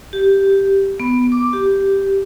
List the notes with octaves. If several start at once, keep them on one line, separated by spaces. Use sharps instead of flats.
G4
B3
D6
G4